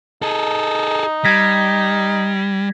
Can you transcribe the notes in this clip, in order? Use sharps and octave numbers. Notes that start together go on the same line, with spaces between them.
D#4 G#4 A4
G3 G#6 A#6 B6